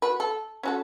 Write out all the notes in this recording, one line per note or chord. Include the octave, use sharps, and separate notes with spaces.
F#4 B4
A4
C#4 F#4 A4